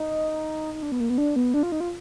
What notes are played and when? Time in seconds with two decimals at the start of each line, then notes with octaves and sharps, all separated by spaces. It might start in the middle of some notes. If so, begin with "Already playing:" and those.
Already playing: D#4
0.74 D#4
0.83 D4
0.92 B3
1.00 A#3
1.10 B3
1.18 D4
1.36 B3
1.54 D4
1.63 F4
1.72 D#4
1.80 F4